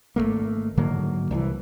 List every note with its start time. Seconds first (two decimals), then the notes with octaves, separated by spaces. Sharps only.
0.16 G#1 D#2 A3 A#3
0.77 G#2 D3 F#3 A#3
1.31 C2 E3